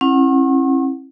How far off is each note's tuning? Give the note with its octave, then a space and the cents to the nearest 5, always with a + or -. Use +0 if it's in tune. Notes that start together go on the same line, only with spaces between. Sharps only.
C#4 -45 E4 +0 F#5 +0